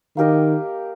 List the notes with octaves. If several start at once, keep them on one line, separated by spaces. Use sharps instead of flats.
D#3 A#3 G4 A#4 D#5